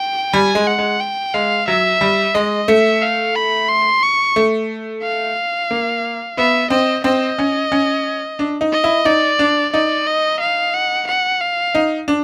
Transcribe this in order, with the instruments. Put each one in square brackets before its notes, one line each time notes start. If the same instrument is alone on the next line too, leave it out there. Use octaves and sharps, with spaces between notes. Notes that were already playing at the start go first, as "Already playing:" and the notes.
Already playing: [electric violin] G5
[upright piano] G3 [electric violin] G#5
[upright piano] G#3
[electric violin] F#5
[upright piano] G#3
[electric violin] G5
[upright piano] G#3 [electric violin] F5
[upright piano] F#3 [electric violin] E5
[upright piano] G3
[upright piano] G#3 [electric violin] D#5
[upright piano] A3 [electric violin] E5
[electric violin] F5
B5
C6
C#6
[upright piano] A3
[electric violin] F5
[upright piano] A#3
[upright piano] B3 [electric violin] E5
[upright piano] C4 [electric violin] D#5
[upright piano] C4 [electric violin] D#5
[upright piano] C#4
C#4
D4
D#4
[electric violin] D#5
[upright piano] E4
[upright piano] D#4 [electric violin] D5
[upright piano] D4
[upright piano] D#4 [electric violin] D5
[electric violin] D#5
F5
F#5
F#5
F5
[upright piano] D#4
D4